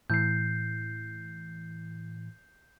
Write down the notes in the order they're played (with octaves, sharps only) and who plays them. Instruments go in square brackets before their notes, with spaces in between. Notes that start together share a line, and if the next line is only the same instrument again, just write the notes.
[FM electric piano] A2 E3 [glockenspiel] G6 C7